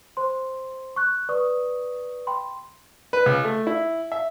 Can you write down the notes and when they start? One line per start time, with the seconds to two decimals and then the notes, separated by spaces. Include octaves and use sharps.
0.17 C5 C6
0.96 C#6 F#6
1.29 B4 D5 C#6 D#6
2.27 G5 B5 C6
3.13 B4
3.26 C#2
3.44 A3
3.67 E4
4.12 E5